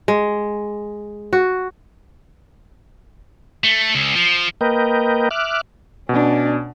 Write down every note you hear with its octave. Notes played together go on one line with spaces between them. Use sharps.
G#3
F#4
A3
C#2
F3
A#3 A#4 B4 D#5 G5
E5 D6 F6 F#6
B2 C#4 D4